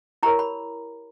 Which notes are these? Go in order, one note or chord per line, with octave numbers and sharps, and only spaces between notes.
E4 G4 A#4 C#5 A#5
B5